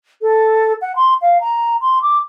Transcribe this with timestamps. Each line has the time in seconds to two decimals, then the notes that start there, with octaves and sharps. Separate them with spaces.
0.22 A4
0.81 F#5
0.96 C6
1.21 F5
1.41 A#5
1.81 C6
2.02 D6